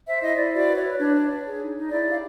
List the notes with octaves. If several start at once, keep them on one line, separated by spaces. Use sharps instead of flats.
C5 E5
E4 D#5
E4 D5
F#4 D5
B4
C#5
B4
D4 C#5
C#5
C#5
G#4
D#4
D#4
E4 D5
G4 F5